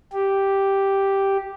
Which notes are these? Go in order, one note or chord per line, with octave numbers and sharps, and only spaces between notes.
G4